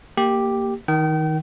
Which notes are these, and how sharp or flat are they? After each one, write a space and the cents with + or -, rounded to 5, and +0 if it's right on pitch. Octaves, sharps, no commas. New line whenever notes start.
A#3 -10 G4 +0
D#3 +20 G5 -35